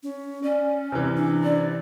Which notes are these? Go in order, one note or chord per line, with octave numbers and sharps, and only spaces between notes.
C#4
C#4 D5
C3 E3
D4
D5